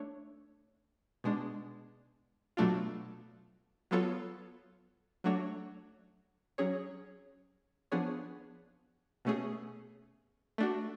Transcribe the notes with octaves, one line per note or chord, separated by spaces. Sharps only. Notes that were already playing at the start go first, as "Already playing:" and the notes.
Already playing: A3 D4 C#5
B2 G#3 D4
B2 F#3 A3 D4 F4
F#3 B3 F4 A4 C#5
F#3 A3 D4 F#4 C#5
F#3 C#4 G#4 C#5
F3 B3 D4 G#4 C#5
B2 A3 C#4 G#4
A3 D4 F#4